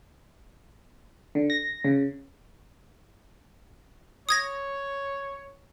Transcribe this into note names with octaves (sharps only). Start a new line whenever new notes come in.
D3
A#6
C#3
C#5 D#6 G#6 A#6